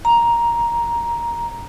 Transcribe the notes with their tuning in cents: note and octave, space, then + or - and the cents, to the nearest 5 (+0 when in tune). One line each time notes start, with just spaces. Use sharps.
A#5 +10